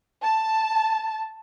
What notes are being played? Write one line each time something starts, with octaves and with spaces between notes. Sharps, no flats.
A5